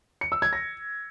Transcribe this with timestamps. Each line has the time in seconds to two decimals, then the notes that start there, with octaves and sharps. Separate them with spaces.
0.21 C#7
0.32 E6
0.42 G#6
0.53 A#6